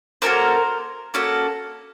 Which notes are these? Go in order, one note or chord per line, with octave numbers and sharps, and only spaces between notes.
A#3 C#4 F#4 A4 A#4 C5
A#3 C#4 F#4 A4